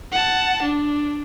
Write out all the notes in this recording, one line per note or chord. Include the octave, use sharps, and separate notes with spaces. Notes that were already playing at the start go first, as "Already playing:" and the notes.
F#5 A5
D4